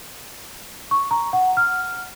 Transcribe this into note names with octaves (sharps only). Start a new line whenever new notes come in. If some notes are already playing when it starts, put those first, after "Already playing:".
C#6
A#5
F#5
F6